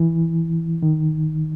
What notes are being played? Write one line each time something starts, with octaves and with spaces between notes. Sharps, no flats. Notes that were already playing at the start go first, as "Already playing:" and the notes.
Already playing: E3
D#3